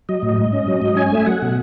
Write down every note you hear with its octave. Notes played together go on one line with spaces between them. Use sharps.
F#3 D#5
A2
G#2
C#4
F#3
G#2
C#4 G#5
A3 E5
F#3 F#5
B2